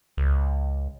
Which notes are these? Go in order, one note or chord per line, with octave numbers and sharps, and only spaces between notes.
C#2